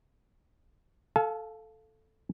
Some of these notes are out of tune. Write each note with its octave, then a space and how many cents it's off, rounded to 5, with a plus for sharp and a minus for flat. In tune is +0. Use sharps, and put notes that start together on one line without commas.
A4 +0 F5 +0 G#5 +45